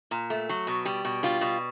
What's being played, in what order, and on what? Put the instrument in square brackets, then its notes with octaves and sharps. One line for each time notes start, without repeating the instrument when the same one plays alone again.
[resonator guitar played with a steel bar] A#2
A3
F#3
B2
G3
B2
G3 F4
B2